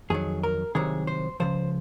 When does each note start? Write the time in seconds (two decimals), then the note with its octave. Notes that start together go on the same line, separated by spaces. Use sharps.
0.10 F2 D#3 F#3 G#4
0.43 A#4
0.75 C2 C3 D#3 F#3 G#4
1.07 C5
1.40 C#2 C#3 F3 C5